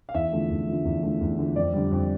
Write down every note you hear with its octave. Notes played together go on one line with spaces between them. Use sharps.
F5
E2 E5
D3 F3 A3
E2
D3 F3 A3
E2
D3 F3 A3
E2
D3 F3 A3
F2 D5
D3 G3
F2